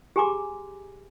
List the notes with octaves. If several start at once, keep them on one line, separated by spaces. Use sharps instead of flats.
G4 G#4 G#5 A#5 C6 D6